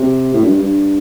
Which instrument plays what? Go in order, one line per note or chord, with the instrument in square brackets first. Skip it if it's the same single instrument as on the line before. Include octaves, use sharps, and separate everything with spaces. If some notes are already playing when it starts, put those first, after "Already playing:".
Already playing: [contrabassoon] C3
A2
F#2
G2
G2